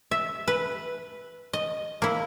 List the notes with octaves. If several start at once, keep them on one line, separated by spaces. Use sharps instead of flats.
E5
B4
D#5
A#3 E4